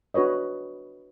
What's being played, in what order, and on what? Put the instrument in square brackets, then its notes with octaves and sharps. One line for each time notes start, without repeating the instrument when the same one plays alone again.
[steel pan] D4 F#4 B4 C#5 D#5